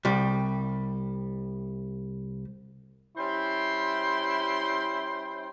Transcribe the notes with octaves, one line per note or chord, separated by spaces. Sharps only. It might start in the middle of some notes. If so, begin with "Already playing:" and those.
C2 G3
G3 C#4 E4 C5 G5 C6